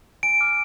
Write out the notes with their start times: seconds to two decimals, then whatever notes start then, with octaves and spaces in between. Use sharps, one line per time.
0.23 G#5 D7
0.41 D6 F6